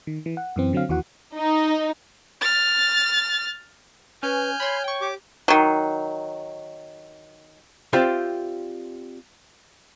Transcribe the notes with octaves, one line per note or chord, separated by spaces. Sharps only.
D#3
E3
F#5
F#2 E3 C4
D3 F#3 C4 F5
D#2 E3 F#4 F#5
D#4
F6 A6
C#4 B4 G#5 F6 G6
C#5 B5 C6
G5 C#6
G4 D6
D#3 F#3
C4 F4 G4 C5 D5 E5